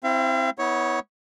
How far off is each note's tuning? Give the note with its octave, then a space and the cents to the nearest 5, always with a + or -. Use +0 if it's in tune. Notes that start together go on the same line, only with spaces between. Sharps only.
C4 +0 E4 +0 F5 -45
B3 +0 E4 -40 C#5 +0